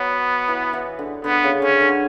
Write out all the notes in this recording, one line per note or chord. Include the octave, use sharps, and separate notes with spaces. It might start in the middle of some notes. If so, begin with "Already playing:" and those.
Already playing: F#3 B3
E3
E3
D3
D3 B3
C#3
D3 C#4
D3